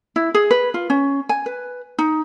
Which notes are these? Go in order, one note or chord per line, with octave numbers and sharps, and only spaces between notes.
E4
G#4
B4
F4
C#4
G#5
B4
D#4